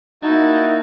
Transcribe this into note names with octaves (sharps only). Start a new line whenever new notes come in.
A#3 D#4 E4 F#4 A5